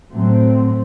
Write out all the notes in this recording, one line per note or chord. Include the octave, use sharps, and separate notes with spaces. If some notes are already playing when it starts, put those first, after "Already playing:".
A2 F#3 A3 C4